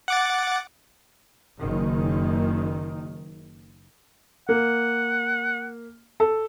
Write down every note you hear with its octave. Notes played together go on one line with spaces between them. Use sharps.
F#5 D6 A6
F#1 D#3
A#3 F#5
A4